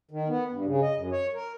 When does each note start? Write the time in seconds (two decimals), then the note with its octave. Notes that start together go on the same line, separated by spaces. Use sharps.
0.11 D#3
0.28 B3
0.51 G2
0.65 C#3
0.82 D#5
0.95 F#2
1.12 C#5
1.34 A#4